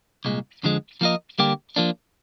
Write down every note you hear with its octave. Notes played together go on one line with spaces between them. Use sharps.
C2 A#2 G#3
F2 D3 F3 G#3
F3 A#3 F4 A#4 D#5
D3 G3 A#3 D4 G4
F3 A#3 D4